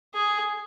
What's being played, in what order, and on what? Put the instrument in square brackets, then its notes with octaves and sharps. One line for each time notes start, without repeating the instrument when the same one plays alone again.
[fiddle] G#4